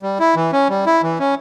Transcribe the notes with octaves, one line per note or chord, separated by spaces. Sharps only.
G3
E4
E3
C#4
G3
E4
E3
C#4